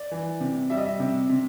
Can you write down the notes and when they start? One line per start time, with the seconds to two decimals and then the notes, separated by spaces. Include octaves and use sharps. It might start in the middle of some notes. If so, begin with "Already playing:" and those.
Already playing: D5
0.11 E3
0.41 C3
0.70 G3 E5
0.77 D#5
0.85 E5
1.00 C3
1.29 C3